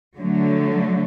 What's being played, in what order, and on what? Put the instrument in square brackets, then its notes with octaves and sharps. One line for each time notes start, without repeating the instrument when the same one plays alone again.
[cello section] D3 F#3 A3